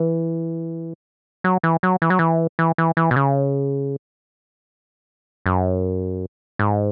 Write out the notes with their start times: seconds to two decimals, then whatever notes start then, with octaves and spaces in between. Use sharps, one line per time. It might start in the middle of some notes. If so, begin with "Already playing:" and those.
Already playing: E3
1.44 F#3
1.63 E3
1.83 F#3
2.02 E3
2.10 F#3
2.19 E3
2.59 E3
2.78 E3
2.97 E3
3.11 B2
3.16 C#3
5.46 F#2
6.59 G#2